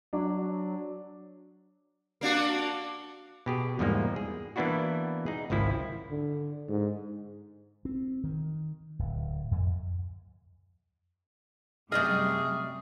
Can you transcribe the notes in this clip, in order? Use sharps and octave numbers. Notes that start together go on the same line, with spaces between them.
F#3 D4
A#3 D4 F#4
B2 G4 G#4
E2 G#2 F3 G3 G#3 A#3
G#4
E3 A#3 B3 D4 E4 F#4
D#4 G#4
G#1 C#2 F3 E4
D3
G#2
C4
D#3
D1
F2
F#2 C3 G3 A3 G#4 D5 D#5 F6